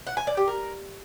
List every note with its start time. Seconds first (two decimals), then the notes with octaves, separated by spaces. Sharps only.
0.07 F#5
0.17 G#5
0.27 D5
0.37 G4
0.47 A#4